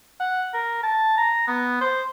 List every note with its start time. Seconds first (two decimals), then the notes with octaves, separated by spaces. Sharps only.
0.20 F#5
0.54 A#4
0.83 A5
1.17 A#5
1.48 B3
1.81 C5